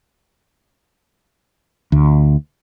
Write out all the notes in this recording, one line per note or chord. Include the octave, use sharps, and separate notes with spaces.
D2